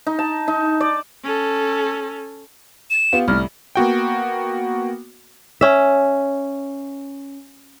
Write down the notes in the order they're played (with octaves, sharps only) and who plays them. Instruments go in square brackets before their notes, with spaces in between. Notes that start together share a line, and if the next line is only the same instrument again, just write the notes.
[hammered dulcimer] D#4
A5
D#4
D5
[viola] C#4 A4
[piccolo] E7
[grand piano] B3 F4 G4
[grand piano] C2 A2 [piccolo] F6
[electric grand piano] A#3 B3 F#4 G5
[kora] C#4 E5